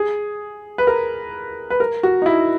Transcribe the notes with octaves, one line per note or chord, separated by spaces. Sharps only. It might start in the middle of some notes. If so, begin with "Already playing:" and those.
Already playing: G#4
B4
A#4
B4
A#4
F#4
D#4
E4